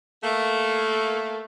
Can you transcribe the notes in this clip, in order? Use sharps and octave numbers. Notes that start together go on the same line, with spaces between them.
A3 A#3